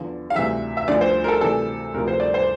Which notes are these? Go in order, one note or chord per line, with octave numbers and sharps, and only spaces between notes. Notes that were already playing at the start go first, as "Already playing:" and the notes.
Already playing: E2 D3 F3
F5
D2 C3 E3 E5
E5
D2 D3 F3 D5
C5
A#4
A4
D2 C3 E3 A4
D2 C3 F3 A#4
C5
D5
C5